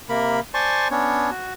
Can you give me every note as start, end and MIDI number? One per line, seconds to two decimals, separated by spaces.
0.09 0.40 48
0.09 0.40 58
0.09 0.40 70
0.09 0.40 83
0.54 0.88 72
0.54 0.88 74
0.54 0.88 80
0.54 0.88 81
0.54 0.88 84
0.54 0.88 85
0.91 1.30 59
0.91 1.30 61
0.91 1.30 62
0.91 1.30 73
1.31 1.53 66